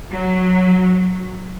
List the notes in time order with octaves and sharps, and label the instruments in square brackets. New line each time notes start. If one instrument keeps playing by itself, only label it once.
[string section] F#3